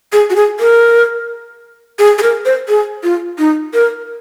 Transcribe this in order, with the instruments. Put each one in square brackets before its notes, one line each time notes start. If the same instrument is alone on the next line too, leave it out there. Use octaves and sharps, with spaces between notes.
[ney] G#4
F#4
G#4
A#4
G#4
G#4
A#4
C5
G#4
F4
D#4
A#4